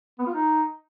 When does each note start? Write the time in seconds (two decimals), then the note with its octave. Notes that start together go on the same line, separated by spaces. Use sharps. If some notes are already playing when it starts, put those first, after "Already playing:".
0.19 B3
0.27 F4
0.34 D#4